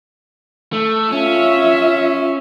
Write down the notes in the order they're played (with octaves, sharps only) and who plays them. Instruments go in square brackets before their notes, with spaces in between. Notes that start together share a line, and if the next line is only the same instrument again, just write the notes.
[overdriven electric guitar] A3
[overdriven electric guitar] C#4 [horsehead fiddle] F4 E5